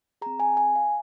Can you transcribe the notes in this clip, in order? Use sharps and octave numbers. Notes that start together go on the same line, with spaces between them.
C4 G#4 A#5
G#5
G#5
F5